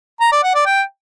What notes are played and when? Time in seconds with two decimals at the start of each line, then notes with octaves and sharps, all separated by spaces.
0.21 A#5
0.32 D5
0.43 F#5
0.55 D5
0.66 G5